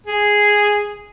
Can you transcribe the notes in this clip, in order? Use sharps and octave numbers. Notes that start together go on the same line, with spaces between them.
G#4